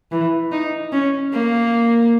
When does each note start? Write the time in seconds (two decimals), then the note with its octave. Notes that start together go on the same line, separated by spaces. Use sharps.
0.11 E3
0.52 D#4
0.92 C#4
1.33 A#3